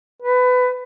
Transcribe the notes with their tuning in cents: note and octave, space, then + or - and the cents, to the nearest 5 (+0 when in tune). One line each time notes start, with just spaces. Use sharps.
B4 +20